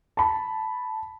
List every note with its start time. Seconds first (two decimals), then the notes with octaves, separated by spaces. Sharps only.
0.17 A5 B5